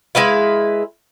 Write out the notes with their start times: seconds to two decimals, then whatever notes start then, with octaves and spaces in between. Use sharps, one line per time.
0.15 G#3 E4 B4 F5